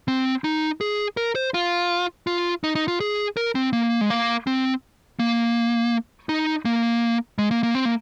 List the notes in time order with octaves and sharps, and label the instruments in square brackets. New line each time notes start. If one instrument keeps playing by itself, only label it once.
[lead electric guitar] C4
D#4
G#4
A#4
C5
F4
F4
D#4
D#4
F4
G#4
A#4
C4
A#3
G#3
A#3
C4
A#3
D#4
A#3
G#3
A#3
A#3
C4
A#3